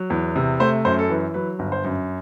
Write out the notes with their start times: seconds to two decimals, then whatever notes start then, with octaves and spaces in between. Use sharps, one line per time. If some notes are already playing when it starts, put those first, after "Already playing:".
Already playing: F#3
0.10 E2
0.36 C3
0.60 A3 C5
0.85 F#2 C5
0.99 A4
1.10 E3 B4
1.34 F#3 B4
1.59 G1
1.72 C5
1.85 F#2